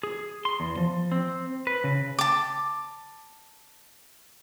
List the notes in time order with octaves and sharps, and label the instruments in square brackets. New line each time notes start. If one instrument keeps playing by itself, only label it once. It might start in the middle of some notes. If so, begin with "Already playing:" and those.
[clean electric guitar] G#4
C6
E2
F3
C4
B4
C#3
[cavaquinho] A5 D6